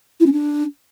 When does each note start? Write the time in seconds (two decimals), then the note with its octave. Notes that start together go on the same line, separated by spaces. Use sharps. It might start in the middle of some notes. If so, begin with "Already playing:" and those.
0.20 E4
0.26 C#4
0.33 D4